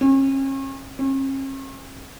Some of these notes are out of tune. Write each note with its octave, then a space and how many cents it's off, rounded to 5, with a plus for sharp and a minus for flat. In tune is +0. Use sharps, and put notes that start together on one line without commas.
C#4 -40
C#4 -45